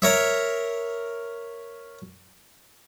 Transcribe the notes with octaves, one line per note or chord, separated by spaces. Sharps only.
A#4 C#5 E5